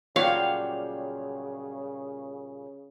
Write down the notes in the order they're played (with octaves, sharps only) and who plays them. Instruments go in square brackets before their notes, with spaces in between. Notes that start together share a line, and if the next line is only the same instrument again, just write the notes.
[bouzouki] A#2 G3 G5 [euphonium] C#3 [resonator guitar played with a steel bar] F#3 F4 C#5 [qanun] F5